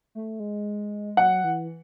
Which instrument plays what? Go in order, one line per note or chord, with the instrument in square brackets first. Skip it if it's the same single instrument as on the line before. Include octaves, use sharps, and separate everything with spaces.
[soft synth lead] A3
G#3
[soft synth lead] F#3 [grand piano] F#5
[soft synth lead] E3